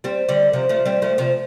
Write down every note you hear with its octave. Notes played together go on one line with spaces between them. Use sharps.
G3 C4
D3 G3
C3 F3
F3 A3
G3 C4
F3 A3
C3 F3